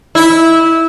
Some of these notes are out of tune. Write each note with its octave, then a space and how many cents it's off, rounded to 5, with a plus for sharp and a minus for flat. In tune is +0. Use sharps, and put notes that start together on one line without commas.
E4 -15